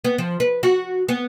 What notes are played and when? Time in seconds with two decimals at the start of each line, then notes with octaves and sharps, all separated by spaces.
0.05 B3
0.18 F3
0.40 B4
0.63 F#4
1.09 B3